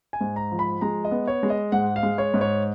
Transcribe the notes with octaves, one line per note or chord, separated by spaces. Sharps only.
G#5
G#2
A#5
F3
B5
G#3 A#5
D#5
B3
C#5
G#3
D#5
G#2 F#5
F5
G#3
C#5
G#2
C#5